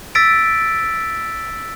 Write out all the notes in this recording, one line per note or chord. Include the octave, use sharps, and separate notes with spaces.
E6 A6 B6 D7